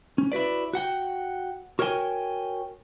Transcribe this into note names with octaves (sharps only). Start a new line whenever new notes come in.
C#4
E4 F#4 B4 D5
F#4 F#5 G5
F#4 A#4 C#5 D5 G5 G#5